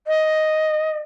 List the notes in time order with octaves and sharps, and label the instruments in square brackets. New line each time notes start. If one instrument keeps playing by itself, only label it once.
[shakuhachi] D#5